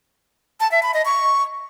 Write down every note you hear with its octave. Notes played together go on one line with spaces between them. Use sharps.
A5
E5
B5
D#5
C#6